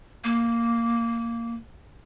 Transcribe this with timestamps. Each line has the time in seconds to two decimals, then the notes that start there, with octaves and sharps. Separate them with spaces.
0.24 A#3